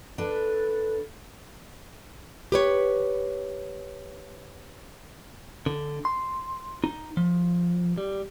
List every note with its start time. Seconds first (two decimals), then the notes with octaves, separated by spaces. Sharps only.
0.18 D4 A4 B4
2.52 G4 B4 C#5
5.66 D3
6.05 C6
6.84 D#4
7.17 F3
7.98 G3